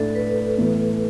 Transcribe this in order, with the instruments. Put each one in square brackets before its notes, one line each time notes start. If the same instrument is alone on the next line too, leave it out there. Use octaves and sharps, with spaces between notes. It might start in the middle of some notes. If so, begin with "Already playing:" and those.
Already playing: [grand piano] A2 A3 D4 [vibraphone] A4
[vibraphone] B4
[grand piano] A2 E3 B3